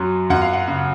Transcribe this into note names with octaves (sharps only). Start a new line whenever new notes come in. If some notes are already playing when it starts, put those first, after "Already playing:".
Already playing: F#2 F#3 C6
F#2 F#5
F5
F#5
C#3